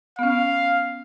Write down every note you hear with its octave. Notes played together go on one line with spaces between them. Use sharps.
B3 C#4 F5